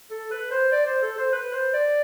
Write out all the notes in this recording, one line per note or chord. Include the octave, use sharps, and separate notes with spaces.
A4
B4
C5
D5
C5
A4
C5
B4
C5
D5